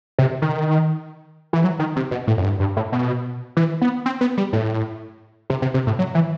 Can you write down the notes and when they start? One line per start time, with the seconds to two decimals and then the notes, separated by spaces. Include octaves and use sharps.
0.19 C3
0.42 D#3
1.53 E3
1.64 F#3
1.79 D#3
1.96 C3
2.11 B2
2.27 A2
2.38 F#2
2.44 G2
2.60 G2
2.77 A2
2.92 B2
3.57 E3
3.81 B3
4.06 C4
4.21 B3
4.37 G3
4.53 A2
5.50 C3
5.62 C3
5.74 C3
5.87 A2
5.99 F#3
6.15 E3